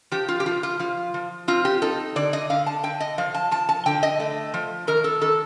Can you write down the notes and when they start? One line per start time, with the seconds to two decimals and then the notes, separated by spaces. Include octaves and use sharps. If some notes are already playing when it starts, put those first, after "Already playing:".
0.12 F3 G4
0.28 F4
0.40 G4
0.46 F3 F4
0.63 F4
0.79 F3 F4
1.14 F3
1.48 C4 F4
1.65 G4
1.82 D#4 A4
2.16 D3 D5
2.33 D#5
2.50 D3 F5
2.66 A5
2.83 D3 G5
3.00 D#5
3.18 F3 F5
3.34 A5
3.51 F3 A5
3.69 A5
3.86 D3 G5
4.03 D#5
4.20 A3
4.54 F3
4.87 D#3 A#4
5.04 A4
5.21 D#3 A4